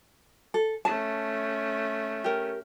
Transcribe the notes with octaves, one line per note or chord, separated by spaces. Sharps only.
A4
A3 C#4 A5
G4 A#4